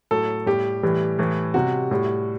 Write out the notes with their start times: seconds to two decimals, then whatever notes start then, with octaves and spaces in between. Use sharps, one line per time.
0.11 A2 F#3 A4
0.46 A2 G3 G4
0.83 A2 E3 G3
1.19 A2 E3 G3
1.54 C3 G3 F#4
1.91 A2 G3